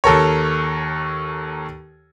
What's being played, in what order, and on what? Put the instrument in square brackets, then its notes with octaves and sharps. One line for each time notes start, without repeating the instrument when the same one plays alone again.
[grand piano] D#2 A4 A#4 C#5